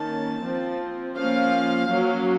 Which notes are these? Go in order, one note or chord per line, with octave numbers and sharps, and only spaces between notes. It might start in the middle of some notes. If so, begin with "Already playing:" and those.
Already playing: D#3 A#3 C#4 A5
F3 C4
F3 A#3 C#4 F5
F#3 A#3 C#4